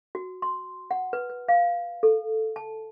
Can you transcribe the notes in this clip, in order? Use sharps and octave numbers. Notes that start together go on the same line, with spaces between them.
F#4
C6
F#5
B4
B4
F5
A4
A5